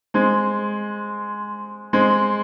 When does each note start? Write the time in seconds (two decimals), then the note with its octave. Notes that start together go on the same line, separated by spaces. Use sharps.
0.14 G#3 C4
1.93 G#3 C4